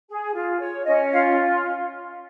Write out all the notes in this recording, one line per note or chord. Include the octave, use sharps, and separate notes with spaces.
G#4
F4
C#5
C#4 D#5
F4 F5